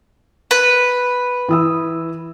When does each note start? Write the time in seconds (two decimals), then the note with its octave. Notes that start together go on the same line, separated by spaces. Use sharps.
0.51 B4
1.49 E3 D#6 E6